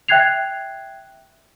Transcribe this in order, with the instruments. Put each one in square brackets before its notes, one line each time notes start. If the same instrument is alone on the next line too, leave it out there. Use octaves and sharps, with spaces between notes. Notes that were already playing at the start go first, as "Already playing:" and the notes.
[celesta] E5 G5 F#6 G#6 C7 F7